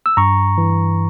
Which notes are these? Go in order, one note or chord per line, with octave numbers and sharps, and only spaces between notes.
E6
G2 A#5 C#6
E3